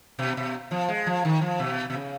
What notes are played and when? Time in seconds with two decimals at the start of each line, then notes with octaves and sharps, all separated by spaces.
0.19 B2
0.37 B2
0.71 F3
0.89 G#3
1.07 F3
1.25 D#3
1.41 F3
1.60 B2
1.90 B2
1.94 C#3